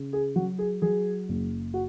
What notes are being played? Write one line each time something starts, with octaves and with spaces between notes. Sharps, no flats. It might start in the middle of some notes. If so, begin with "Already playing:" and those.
Already playing: C#3
G#4
F#3 F#4
G#4
F#3 G#4
F#1
F#4